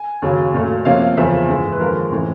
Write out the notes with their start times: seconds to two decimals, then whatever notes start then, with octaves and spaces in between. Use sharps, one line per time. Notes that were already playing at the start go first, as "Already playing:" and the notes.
Already playing: G#5
0.22 D#2 C#3 F#3
0.54 A#2 F#3 A3
0.85 C3 F3 A#3 C#4 F5
1.01 F5
1.17 E2 C#3 F3 A#3 C#4 E5
1.49 G#2 E3 G#3
1.73 B4
1.80 D#2 D3 F3 G#3 A#4
2.12 A2 E3 G#3 C4